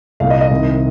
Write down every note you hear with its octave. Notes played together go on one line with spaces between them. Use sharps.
C2 A#2 F5
D#5
D#5
C2 C3 D#3